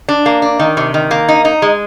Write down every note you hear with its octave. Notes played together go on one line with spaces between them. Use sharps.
D4
A#3
D4
D#3
C3
D#3
A#3
D#4
D#4
G#3